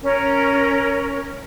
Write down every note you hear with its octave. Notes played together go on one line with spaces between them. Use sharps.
C#4 A#4